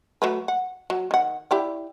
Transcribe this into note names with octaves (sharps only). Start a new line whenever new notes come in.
F#3 A3 B4
F#5
F#3
D#3 F#5
E4 G4 D5